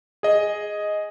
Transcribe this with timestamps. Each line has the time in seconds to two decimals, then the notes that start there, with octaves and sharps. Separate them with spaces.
0.23 G#4 D#5